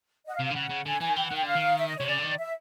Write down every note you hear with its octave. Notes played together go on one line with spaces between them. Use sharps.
D#5 F#5
F5
C3
F5
D3
C#3 F#5
C#3
D3 G#5
E3 G#5
D#3
E3 G5
F#5
D#3
G5
D3 F5
D#3
E5
D#5
C3 C#5
C#3 D5
D3
D#3
E5